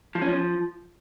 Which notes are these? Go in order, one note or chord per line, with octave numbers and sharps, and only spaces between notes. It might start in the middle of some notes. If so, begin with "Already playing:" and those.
F3
C#4
F3